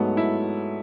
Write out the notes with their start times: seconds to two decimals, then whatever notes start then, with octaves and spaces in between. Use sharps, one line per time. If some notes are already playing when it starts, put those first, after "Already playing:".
Already playing: G#2 F#3 A3 B3
0.17 E4